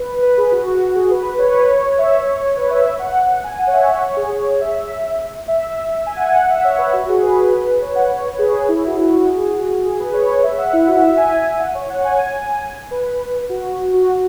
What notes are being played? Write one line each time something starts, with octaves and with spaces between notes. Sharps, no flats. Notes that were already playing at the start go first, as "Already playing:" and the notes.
Already playing: B4
B4
G#4
F#4
F#4
G#4
B4
C#5
B4
C#5
C#5
E5
C#5
B4
E5
E5
F#5
G#5
F#5
C#5
E5
C#5
C#5
G#4
G#4
E5
E5
E5
G#5
F#5
G#5
F#5
E5
C#5
B4
F#4
G#4
B4
C#5
F#5
C#5
B4
G#4
E4
F#4
E4
F#4
G#4
F#4
G#4
B4
C#5
E5
F#5
E4
F#4
E5
G#5
F#5
C#5
F#5
G#5
B4
B4
F#4
F#4